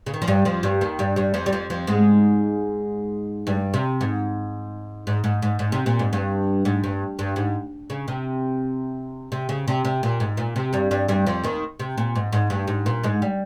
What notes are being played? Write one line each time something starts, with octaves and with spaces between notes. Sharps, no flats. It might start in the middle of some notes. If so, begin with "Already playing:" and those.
C#3
D#3
F3
G2 G3
F2 F3
G2 G3
D#2 D#3
G2 G3
G2 G3
F2 F3
G3
F2 F3
F2 F3
G#2 G#3
G2 G3
C3
G#2
G#2
G#2
G#2
G#2
C3
A#2
G#2
G2
G#2
G2
G2
G#2
C#3
C3
C3
C#3
C3
C3
A#2
G#2
A#2
C3
G2 G3
G2 G3
G2 G3
F2 F3
D#2 D#3
C3
A#2
G#2
G#2
G2
G#2
A#2
G#2 G#3
G3